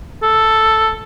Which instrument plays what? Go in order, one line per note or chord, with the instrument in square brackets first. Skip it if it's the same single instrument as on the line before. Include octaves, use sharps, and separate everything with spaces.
[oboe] A4